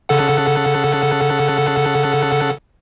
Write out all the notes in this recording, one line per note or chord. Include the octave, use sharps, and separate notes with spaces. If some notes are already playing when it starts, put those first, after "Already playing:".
C#3 A4 F#5